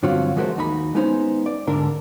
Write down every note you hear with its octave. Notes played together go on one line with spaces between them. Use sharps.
G2 D3 F#3 C4 F4 F#4
E3 G#3 A3 F#4 A#4 C5
D#2 D#4 F#4 B5
G#3 B3 C#4 D#4 G4 C5
D5
D2 G#2 D3 D4 A#4 D5